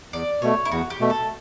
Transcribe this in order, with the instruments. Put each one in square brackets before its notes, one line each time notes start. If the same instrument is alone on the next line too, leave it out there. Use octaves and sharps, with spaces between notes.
[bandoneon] E2 [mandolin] D5
[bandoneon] B2 A3 [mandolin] C#5
[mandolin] E4
[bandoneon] E2 [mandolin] F#4
[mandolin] G4
[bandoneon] B2 A3
[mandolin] A4